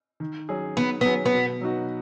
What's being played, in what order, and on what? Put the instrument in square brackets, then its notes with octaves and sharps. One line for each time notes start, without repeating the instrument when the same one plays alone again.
[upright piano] D#3
F#3 C#4 G#4
[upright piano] D#3 [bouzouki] B3
[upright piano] F#3 C#4 G#4 [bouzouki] B3
[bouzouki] B3
[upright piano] B2
F#3 D#4 F#4